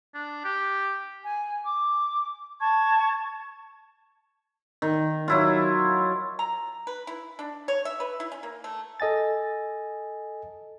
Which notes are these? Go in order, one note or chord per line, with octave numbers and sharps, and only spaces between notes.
D4
G4
G#5
D6
A5 C#6 G#6
D#3
F#3 E4 F4
A#5
B4
E4
D4
C#5
E5
B4
E4
C#4
A#3
A3
A4 D#5 G#5 A6